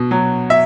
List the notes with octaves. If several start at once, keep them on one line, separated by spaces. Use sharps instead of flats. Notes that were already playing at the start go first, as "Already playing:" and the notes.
Already playing: B2
F#3
E5